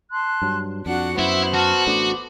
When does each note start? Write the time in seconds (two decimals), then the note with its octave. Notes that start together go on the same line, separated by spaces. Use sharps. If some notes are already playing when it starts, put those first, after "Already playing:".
0.11 A5 C6 F#6
0.42 G2 F#3
0.86 F2 D4 F#4 F#5
1.19 F#2 B3 E4 C5
1.54 F#4 A5 F6
1.87 A1 A3 D4 D6